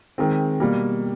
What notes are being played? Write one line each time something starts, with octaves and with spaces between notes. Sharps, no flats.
D#3 G#3 C4
B2 G3 A#3